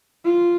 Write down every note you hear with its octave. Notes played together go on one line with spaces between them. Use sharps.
F4